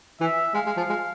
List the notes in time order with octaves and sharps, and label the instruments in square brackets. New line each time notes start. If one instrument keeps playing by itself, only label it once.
[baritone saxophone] E3 [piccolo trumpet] E5
[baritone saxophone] G#3 [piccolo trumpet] F5
[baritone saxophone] G#3
F3
G#3